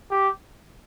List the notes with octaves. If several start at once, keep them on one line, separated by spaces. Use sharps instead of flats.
G4